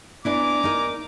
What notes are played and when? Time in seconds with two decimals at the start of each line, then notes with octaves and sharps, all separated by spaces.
0.25 B3 D4 E4 G#5 A#5 D6
0.64 D#4 A#4